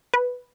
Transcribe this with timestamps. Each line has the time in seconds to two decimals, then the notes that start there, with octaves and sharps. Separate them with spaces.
0.14 B4